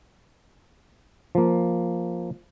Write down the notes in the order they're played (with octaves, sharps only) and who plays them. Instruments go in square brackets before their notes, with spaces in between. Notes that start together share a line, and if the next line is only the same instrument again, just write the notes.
[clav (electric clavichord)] F3 A#3